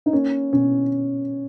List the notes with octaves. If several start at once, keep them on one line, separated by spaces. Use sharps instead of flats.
D#4
A#3 C#4
B2 C#4